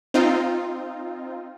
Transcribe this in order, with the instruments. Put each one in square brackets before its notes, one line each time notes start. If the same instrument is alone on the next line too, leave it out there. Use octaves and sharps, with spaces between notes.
[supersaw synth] C4 D#4 F4